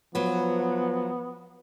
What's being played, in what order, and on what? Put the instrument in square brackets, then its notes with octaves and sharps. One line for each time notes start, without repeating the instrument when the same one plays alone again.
[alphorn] F3 [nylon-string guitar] F#3 B4 [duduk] B3